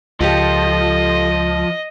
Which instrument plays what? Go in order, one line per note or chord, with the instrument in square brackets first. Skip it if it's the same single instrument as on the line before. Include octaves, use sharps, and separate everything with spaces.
[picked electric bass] C#2 [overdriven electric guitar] F3 [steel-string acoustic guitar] F4 G4 A4 [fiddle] D#5